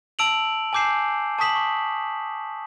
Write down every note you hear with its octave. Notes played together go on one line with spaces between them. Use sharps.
A5 E6 D7 F7 F#7
G#5 A5 D6 G6 C7 E7
A5 C#6 D#6 B6 E7 F#7
C#6